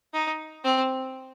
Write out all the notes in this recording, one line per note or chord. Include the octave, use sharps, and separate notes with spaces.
D#4
C4